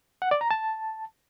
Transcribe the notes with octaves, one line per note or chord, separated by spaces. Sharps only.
F#5
D5
A#5
A5